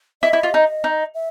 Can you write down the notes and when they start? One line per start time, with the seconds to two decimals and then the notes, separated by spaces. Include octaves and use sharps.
0.23 E4 D#5
0.33 E4
0.43 F4
0.54 D#4
0.84 D#4
1.14 E5